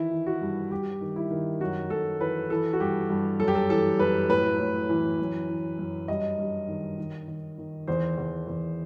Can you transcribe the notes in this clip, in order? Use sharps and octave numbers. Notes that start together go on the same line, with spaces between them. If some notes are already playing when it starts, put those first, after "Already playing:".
Already playing: D#3 E3 E4
E3
F#4
G2
G2 G4
D#3
E4
D#3
F#2 F#4
F#2 A4
E3 B4
E3 A4
F#4
G2 G4
G2
F#2 A4
G4
A4
E3 A4
F#2 B4
A2 B4
A2
E3
F#2
E3
F#2
G2 D#5
G2
D#3
D#3
D#3
D#3
E2 C5
E2
E2